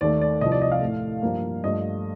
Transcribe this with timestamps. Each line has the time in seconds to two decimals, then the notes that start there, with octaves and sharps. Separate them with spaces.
0.01 D#2 D#3 A3 D5
0.21 D5
0.41 C2 C3 F3 D#5
0.52 D5
0.62 D#5
0.72 F5
0.81 A2 A3
1.22 G2 F3 A#3
1.64 G2 F3 A3 D#5